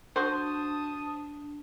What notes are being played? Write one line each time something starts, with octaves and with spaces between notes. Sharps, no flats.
D4 F#4 C5 A5 D#6